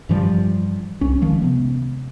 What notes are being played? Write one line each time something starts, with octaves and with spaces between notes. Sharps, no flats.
G2 E3 F3 G3
C2 C#4
D#3 F3 G#3
C3 B3